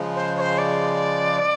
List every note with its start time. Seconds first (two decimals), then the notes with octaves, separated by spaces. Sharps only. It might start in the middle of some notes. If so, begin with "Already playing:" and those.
Already playing: C#3 F3 G#3
0.15 C5
0.37 C#5
0.40 C5
0.58 D5